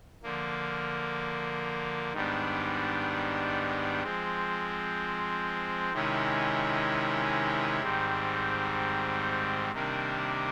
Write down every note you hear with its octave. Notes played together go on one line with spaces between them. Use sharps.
D3 F3 A#3
G#2 D#3 G3 B3 D4
F3 G#3 C4
C3 D#3 G#3 C#4 E4
G#2 D#3 G3 C4
C3 D#3 G3 A#3 D4